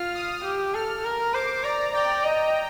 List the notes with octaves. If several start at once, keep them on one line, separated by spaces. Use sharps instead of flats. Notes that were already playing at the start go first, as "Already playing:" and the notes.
Already playing: F4 F6
D#6
G4
A4 F6
A#4
C5 D6
D5 A#5
D5 G5
D#5